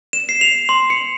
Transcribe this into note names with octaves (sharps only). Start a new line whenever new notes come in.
E7
C7
F7
C6
C#7